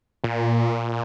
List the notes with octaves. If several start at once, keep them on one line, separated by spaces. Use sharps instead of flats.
A#2